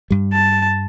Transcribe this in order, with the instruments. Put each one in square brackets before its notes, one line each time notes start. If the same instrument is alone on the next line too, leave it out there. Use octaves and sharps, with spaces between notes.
[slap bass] G2 G3
[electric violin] A5